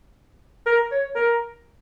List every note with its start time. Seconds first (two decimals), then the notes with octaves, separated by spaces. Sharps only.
0.66 A#4
0.91 C#5
1.16 A#4